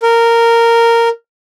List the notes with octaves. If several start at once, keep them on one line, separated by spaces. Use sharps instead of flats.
A#4